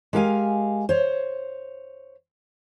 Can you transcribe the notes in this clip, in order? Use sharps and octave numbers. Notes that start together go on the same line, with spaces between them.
G#3 G4 A#4 F5 G#5
C5 C#5